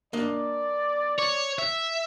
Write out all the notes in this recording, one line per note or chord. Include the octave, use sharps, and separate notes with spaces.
A#3 D4 D5 D#5
C#5
E5